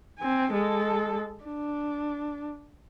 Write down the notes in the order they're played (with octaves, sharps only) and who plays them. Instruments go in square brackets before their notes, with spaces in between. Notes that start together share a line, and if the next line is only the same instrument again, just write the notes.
[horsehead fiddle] C4 G#5
G#3 A4
D4